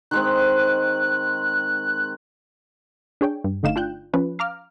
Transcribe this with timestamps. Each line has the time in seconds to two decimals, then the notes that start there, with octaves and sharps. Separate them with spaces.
0.11 D#3 G#3 C4 F#6
3.21 D4 G#4 C#5 G5
3.44 G2
3.63 G1 D3 A3 D#4 F5 E7
3.76 D4 F4 G5 F#6 G6
4.14 F3 C#4 B4
4.39 F5 A#5 D6 F6